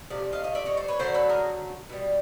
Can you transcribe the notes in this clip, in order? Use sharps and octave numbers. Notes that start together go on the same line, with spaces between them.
C3 F3 A3 D5
D#5 F5
D#5 F5
D5 E5
C#5 D#5
C5 D5
B4 C#5
D3 F#3 A3 A#4 C5
A4 B4
G#4 A#4
B2 G3